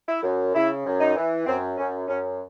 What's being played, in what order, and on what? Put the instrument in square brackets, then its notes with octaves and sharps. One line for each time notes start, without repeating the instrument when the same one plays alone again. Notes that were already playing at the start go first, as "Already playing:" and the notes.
[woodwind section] E4
F#2
C#3 E4
F#2
D#4
E3
F#2 C4
F#2 C#4
F#2 C#4